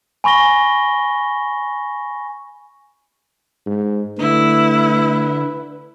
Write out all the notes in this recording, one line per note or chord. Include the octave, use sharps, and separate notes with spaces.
G#5 B5 C#6 A#6 G7
G#2
D3 A3 E4 B4